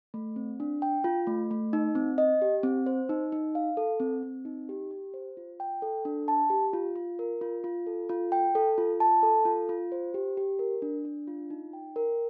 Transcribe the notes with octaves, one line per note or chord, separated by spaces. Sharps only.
A3
C4
D4
G5
F4
A3
A3
D#4
C4
D#5
G4
C4
C5
D#4
D#4
F5
A4
C4
C4
D#4
G4
G4
C5
F4
G5
A4
D4
A5
G4
F4
F4
A#4
F4
F4
A4
F4
G5
A4
F4
A5
A4
F4
F4
C5
G4
G4
A#4
D4
D4
F4
D#4
G5
A#4